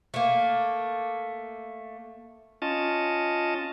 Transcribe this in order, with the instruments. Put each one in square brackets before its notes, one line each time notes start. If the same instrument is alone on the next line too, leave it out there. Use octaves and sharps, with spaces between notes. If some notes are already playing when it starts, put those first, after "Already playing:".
[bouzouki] A3 A#3
[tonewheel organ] C#4 F4 D#5 A5